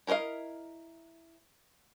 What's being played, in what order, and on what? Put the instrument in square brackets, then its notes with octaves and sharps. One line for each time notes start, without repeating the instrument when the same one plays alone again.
[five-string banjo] E4 A#4 C5 D#5 F5